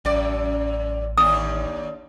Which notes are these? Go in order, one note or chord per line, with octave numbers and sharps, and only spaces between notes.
A1 F#2 D5
D#2 D4 D#6